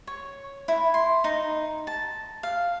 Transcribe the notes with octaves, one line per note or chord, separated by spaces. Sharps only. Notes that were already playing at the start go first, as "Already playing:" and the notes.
C#5
E4
C6
D#4
A5
F5